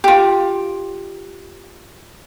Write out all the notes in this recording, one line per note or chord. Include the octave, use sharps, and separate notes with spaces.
F4 G4